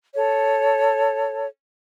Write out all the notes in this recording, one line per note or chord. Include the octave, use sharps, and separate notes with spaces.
A4 C#5